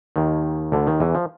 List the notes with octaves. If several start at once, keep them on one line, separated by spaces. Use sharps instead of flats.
D#2 D#3
D2 D3
D#2 D#3
E2 E3
F3